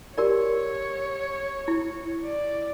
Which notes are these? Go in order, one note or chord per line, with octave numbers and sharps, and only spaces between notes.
G4 A#4 C#5 D5
E4
D5